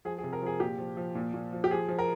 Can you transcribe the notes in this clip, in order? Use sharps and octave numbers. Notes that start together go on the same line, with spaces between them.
F3 G#4
G#4
C3
A#4
F3 G#4
A#2 G4
F3
F3
A#2
A#2
F3
G4
F3 G#4
F3
A#4